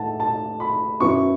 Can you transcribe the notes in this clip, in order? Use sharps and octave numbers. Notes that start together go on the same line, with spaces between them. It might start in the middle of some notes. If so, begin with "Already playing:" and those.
Already playing: A2 A3 E4 F#5 A5
A5
B5
F#2 F#3 B3 E4 C#6